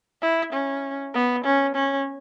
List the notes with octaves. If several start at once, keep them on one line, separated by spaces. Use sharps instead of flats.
E4
C#4
B3
C#4
C#4